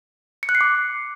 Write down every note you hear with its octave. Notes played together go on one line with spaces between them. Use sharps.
C#7
F#6
C7
D6